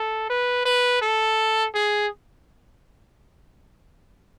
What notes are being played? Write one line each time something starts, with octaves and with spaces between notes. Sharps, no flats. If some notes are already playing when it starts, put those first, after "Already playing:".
Already playing: A4
B4
B4
A4
G#4